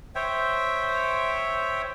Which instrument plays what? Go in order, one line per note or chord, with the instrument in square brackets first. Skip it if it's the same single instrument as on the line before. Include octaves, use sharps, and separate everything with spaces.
[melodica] C5 C#5 E5 G5